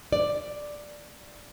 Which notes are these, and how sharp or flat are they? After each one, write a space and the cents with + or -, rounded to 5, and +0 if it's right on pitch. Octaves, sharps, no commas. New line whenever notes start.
D5 +5